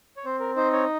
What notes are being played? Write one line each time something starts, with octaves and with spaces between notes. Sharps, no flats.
C#5
C4 C5
A#4
D#4 C5
C#5